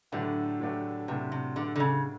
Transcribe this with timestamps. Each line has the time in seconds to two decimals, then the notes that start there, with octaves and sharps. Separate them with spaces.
0.12 A2 D3 F#3 A3 D4 G4
0.60 A2 F#3 A3 D4 G4
1.08 A2 C3 F#3 A3 D4 G4
1.32 C3
1.56 A2 D3 F#3 A3 D4 G4
1.76 D3
1.80 C#3